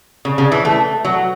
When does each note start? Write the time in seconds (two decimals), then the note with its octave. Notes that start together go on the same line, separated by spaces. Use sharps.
0.25 C#3
0.38 C#3
0.52 E3
0.65 A3
1.05 F#3